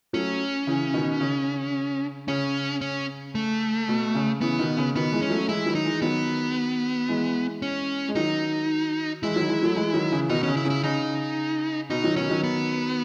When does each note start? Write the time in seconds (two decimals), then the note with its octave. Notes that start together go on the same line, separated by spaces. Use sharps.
0.13 F#3 A3 C#4
0.67 C#3 E3
0.94 B2 D#3
1.20 C#3
2.28 C#3 C#4
2.81 C#4
3.35 A3
3.88 B2
4.15 C#3
4.41 C#3 E3 B3
4.59 B2 D#3
4.77 C#3
4.95 B2 D#3 B3
5.12 E3 G#3
5.22 C#4
5.30 F#3 A3
5.48 E3 G#3 E4
5.66 D#3 F#3
5.75 D#4
5.84 E3 G#3
6.02 D#3 F#3 B3
7.08 E3 G#3
7.62 C#4
8.09 G#3
8.15 D#3 F#3 D#4
9.23 E3 G#3 E4
9.36 D#3 F#3
9.49 E3 G#3
9.63 F#3 A3
9.76 E3 G#3
9.94 D#3 F#3
10.12 C#3 E3
10.29 B2 D#3 D#4
10.43 C#3 C#4
10.57 E4
10.65 C#3
10.70 E4
10.83 C#3 D#4
11.90 B2 D#4
12.03 D#3 F#3
12.16 B2 D#3 C#4
12.30 D#3 F#3
12.43 B3